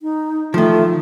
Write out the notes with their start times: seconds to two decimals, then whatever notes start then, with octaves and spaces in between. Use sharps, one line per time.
0.02 D#4
0.54 D#3 F3 A3